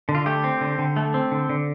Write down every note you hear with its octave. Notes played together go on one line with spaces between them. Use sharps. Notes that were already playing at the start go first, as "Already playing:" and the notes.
D3
F4
A3 G4
C4
D3
D3
A3
C4
D3
D3